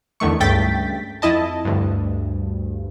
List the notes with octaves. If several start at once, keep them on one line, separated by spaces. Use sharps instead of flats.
E2 D3 D#3 A3 C#6
C#2 G2 A3 G5 A6 B6
F2 E4 D#5 A5
D2 G2